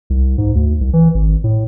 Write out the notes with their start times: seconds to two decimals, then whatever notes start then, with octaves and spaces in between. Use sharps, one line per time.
0.10 C2
0.38 G#2
0.55 D2
0.81 C2
0.93 E3
1.15 G#1
1.44 A2